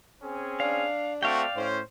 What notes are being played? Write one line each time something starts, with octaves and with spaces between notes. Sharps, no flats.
C4 C#4 G#4
D4 F5
A3 C4 F#4 D5 F5 G5
A2 C#4 C5